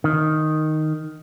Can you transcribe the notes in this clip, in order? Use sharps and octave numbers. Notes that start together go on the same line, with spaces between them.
D#3